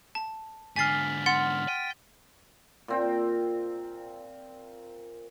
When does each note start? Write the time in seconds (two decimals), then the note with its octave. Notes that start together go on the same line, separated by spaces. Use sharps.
0.15 A5
0.76 G#2 D3 G#5 F6 A6 B6 C7
1.26 F#5 C6 A6
1.68 G5 D#7
2.88 A#2 C4 G5